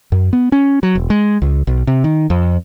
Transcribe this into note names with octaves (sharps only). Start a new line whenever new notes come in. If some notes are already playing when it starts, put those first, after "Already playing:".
F#2
B3
C#4
F#3
E1
G#3
C#2
B1
C3
D#3
F2